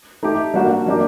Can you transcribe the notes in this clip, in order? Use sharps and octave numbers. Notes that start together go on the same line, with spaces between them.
A3 D#4 G4
G3 A#3 D4 F#4 A#4
F#3 A#3 D4 G4